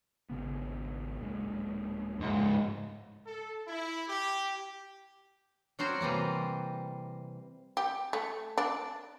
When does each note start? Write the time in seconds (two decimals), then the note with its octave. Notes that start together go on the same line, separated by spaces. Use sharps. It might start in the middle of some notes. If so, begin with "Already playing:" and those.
0.29 G#1 C#3 B3
1.19 D1 A#2 G#3
2.20 C#2 G#2
3.25 A4
3.66 E4
4.08 G4
5.79 G3 C4 F#4 A#4 C5 C#5
6.01 C3 E3 G3 A#3
7.77 G4
8.13 A3
8.58 D4